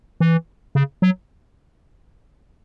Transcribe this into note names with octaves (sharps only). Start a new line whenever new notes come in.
E3
C#3
F#3